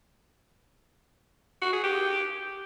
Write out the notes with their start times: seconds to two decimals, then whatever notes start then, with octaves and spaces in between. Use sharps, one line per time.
1.62 F#4
1.73 G#4
1.84 G4